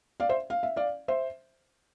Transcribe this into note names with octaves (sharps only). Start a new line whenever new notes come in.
D5 F5
C5 E5
F5
E5
D5 F5
C5 E5